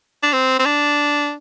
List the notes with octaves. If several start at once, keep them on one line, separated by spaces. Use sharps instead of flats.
D4
C4
C4
D4